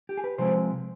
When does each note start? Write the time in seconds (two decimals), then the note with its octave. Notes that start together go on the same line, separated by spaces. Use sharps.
0.09 G4
0.17 G#4
0.24 B4
0.38 C3 F3 G#3 C4 C5